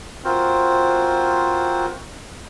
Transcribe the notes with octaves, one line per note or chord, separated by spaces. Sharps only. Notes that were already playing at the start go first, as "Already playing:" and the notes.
C4 F4 F#4 A#4 C5